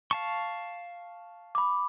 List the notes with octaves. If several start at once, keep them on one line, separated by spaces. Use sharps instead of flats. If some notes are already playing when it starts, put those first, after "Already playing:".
F5 A5 C#6
B5 D6